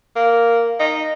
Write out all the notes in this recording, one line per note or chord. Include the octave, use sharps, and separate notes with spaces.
A#3
D#4